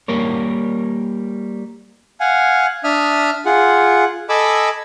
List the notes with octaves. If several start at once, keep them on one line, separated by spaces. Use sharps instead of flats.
G3 A#3 A#4 C#5
F5 F#5 G#5
D4 E5 D#6 F6
F4 G#4 F#5
A4 D#5 G#5 B5 D6 E6